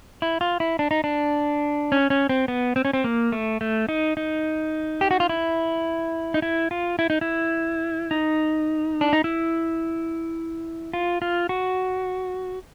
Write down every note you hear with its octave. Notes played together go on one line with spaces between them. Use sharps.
E4
F4
E4
D4
D#4
D4
C#4
C#4
C4
B3
C4
C#4
C4
A#3
A3
A3
D#4
D#4
G4
F#4
F4
E4
D#4
E4
F4
E4
D#4
E4
D#4
D4
D#4
E4
F4
F4
F#4